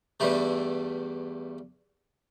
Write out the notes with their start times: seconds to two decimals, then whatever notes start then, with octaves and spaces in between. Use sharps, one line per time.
0.20 E2 G2 G3 A3